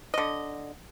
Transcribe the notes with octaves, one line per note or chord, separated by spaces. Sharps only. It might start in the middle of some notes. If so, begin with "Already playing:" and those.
D3 D#5